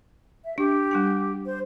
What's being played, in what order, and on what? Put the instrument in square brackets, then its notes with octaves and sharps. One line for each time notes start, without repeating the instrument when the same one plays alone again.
[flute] E5
[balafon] D4 [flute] G4
[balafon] G3 D4 G5
[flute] C5